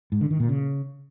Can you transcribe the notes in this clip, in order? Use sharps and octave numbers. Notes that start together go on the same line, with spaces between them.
G#2
D3
D#3
A#2
C#3